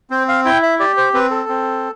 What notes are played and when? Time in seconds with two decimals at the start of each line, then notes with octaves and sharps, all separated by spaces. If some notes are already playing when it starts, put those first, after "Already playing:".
0.10 C4 C5
0.29 F5
0.45 E4 G5
0.63 E5
0.79 G4 D5
0.97 C5
1.14 C4 B4
1.31 A4
1.49 C4